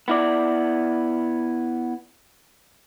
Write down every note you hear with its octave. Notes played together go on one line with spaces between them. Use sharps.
B3 E4 D5